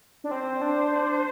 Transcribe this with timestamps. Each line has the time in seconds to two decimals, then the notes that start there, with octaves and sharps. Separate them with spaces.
0.24 D4
0.31 C4 C5
0.62 D4
0.92 D4